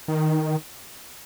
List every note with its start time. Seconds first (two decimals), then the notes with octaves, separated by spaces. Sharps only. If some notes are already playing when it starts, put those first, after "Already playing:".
0.08 D#3